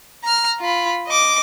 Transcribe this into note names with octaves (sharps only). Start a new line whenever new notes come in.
A#5 F6
F4 B5
D#5 D6